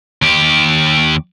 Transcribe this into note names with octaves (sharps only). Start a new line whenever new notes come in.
D#2 G4